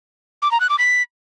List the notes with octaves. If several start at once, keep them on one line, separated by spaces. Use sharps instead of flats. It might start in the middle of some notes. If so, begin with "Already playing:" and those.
D6
A#5
F#6
D6
B6